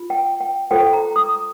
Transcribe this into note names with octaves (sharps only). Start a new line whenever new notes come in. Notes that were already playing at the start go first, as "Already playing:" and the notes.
Already playing: F4
G5
G5
F4 A4 C5 G5
A#5
D#6